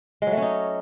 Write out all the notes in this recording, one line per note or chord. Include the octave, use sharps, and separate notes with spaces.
G#3
F#3
A3
C#4
D#4